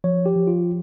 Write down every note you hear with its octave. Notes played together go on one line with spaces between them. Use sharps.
F3 C#5
G4
F3
F4